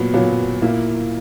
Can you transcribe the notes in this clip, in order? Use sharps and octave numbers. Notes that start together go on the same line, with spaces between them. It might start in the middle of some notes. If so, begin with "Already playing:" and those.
Already playing: A#2 F#3 B3
A#2 F#3 B3
A#2 A#3 E4